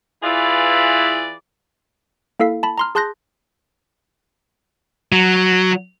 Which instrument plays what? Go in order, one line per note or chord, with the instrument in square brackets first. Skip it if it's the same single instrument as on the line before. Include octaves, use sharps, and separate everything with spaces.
[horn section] E3 E4 F4 G#4 B4 D5
[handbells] A#3 E4 A4 F5 B6
A5 B5
A#5 C6 F6
G#4 A5 C6 F#6 G6 A#6
[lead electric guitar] F#3